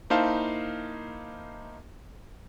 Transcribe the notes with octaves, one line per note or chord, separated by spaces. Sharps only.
A#3 D#4 E4 C5 F5 A5